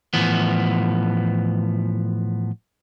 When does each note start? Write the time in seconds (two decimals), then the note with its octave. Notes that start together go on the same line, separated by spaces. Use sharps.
0.14 A2 E3 F3 B3